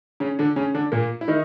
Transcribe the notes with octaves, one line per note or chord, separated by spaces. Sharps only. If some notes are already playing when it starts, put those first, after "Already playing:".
C#3 C#4
D3 D4
C#3 C#4
D3 D4
A#2 A#3
E4
D#3 D#4